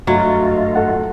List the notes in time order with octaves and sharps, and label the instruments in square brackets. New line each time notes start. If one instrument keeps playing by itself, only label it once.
[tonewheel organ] G2 A3 F4 [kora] F#3 [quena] D#5
[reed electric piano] A4 F#5